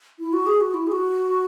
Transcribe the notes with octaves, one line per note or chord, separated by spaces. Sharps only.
E4
F#4
G#4
F#4
E4
G#4
F#4